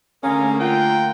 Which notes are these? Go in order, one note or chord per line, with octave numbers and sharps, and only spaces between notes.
D3 A3 A#3 C#4 G#4 A#4 F5
F4 A#4 F#5 G5